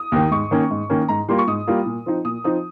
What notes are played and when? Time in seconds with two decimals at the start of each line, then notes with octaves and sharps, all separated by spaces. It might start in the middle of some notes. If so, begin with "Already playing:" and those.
Already playing: D#6
0.12 D#2 D#3
0.31 G#2 C#6
0.51 D#3 A#3 C#4
0.71 G#2
0.90 D#3 A#3 C#4
1.08 G#2 A#5
1.29 G3 A#3 F4 C6
1.38 C#6
1.48 G#2 D#6
1.67 G3 A#3 F4
1.86 A#2
2.06 F3 C4 D#4
2.25 A#2 D#6
2.44 F3 C4 D#4 D#6